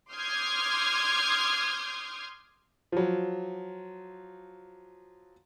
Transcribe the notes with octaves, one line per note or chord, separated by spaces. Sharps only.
C6 D6 D#6 F6 G6 G#6
F3 F#3